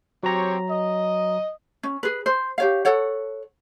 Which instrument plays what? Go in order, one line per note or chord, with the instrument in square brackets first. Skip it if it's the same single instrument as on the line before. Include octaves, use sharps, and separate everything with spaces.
[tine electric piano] F#3 A#5 [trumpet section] C4 G4 C#5
[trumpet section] D#5
[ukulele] C#4
G#4 B4
C5
G4 C#5 F5
A4 C#5 F#5